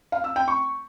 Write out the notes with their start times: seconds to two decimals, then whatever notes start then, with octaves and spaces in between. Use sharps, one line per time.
0.12 F5
0.24 E6
0.36 G5
0.48 C#6